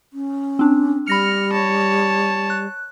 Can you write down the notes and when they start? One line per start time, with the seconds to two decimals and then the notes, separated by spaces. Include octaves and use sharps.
0.13 C#4
0.59 C4 D4
1.07 G3 B5 F6 A#6 C#7
1.53 C#5 A5
2.50 F#6